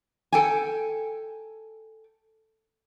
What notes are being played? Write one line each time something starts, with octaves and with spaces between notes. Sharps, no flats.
A4 G5 G#5